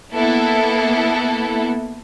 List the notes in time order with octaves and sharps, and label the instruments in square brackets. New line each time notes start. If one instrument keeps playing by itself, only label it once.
[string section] A#3 B3 E4 A4